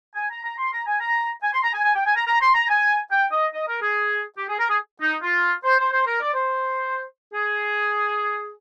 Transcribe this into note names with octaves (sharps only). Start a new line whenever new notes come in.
G#5
A#5
A#5
C6
A#5
G#5
A#5
G#5
C6
A#5
G#5
G#5
G5
G#5
A#5
A#5
C6
A#5
G#5
G5
D#5
D#5
A#4
G#4
G4
G#4
A#4
G#4
D#4
F4
C5
C5
C5
A#4
D5
C5
G#4